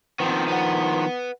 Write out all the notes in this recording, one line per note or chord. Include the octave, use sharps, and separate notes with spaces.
D#3 F3 B3 C4
B4 F#5